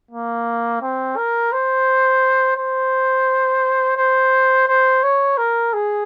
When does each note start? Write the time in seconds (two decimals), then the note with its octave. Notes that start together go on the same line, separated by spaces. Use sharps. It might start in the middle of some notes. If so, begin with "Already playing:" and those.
0.11 A#3
0.82 C4
1.17 A#4
1.52 C5
2.57 C5
3.97 C5
4.68 C5
5.03 C#5
5.37 A#4
5.73 G#4